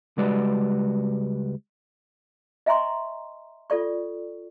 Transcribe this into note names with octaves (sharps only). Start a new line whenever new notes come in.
C#2 G3 G#3 F#4 B4 D5
D#5 E5 G#5 A#5 C6 C#6
F4 A4 D5 C#6